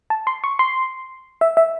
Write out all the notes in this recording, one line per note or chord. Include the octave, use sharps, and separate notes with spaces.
A5
C6
C#6
C6
E5
E5